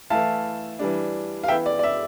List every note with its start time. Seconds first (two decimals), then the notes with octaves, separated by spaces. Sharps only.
0.10 E3 A3 E4 F5 A5
0.79 E3 G3 D4
1.44 F5
1.48 E3 B3 E4 E5 G5
1.66 D5
1.79 D5
1.83 E5